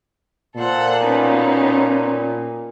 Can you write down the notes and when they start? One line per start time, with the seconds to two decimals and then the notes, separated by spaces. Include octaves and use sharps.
0.56 A#2 A4 C5 F#5
1.04 B2 C#4 D#4